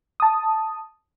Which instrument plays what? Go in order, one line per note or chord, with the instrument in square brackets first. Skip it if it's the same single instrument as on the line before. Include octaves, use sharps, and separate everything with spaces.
[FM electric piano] A5 D#6